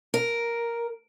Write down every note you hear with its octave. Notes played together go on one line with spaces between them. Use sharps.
A#4